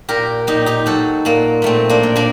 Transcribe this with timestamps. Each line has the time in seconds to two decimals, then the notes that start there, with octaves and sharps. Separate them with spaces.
0.09 A#2 G4 A#4
0.47 A#2 D#4 G4
0.66 D#4 G4
0.86 F#3 F#4 A4
1.25 A#2 A#3
1.62 A#2 A3 C4
1.89 A#3 D4
2.03 A#2
2.16 A#3 D4